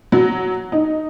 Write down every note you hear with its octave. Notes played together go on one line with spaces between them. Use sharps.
F#3
D#4